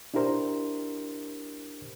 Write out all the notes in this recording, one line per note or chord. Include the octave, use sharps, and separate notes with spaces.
D4 E4 G4 A#4 C5